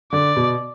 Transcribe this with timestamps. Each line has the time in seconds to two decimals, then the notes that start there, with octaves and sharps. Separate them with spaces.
0.12 D3 D5
0.36 B2